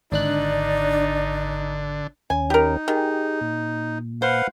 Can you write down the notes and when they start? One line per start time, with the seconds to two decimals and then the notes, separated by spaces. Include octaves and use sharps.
0.12 G#1 D3 D4 D#4 D5 F#6
2.30 D#2 C#4 G#5
2.50 D#4 G4 A#4
2.88 D#3 G4 G#4
3.41 A#2
4.22 B4 C5 F5 F#5